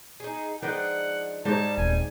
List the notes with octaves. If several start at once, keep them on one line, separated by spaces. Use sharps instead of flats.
D#4 G#4
F3 G#3 D4 D#4 B4 F#5 G5
G#2 G3 D#4 C#5 A5
D#1 C4 G#5